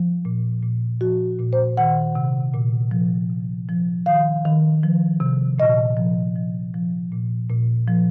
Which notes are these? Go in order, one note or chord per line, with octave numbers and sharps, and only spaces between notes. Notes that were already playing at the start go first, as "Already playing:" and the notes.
Already playing: F3
A#2
A#2
F3 F#4
A#2
C5
D#3 F#5
C3
A#2
F3
C3
F3
D#3 F5
D#3
F3
C3
A#2 D#5
F3
F3
F3
A#2
A#2
F3